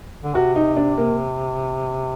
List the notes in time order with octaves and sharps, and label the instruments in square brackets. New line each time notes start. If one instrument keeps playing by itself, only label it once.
[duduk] D3
[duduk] C3 [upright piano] F#4
[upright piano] D#4
D4
A#3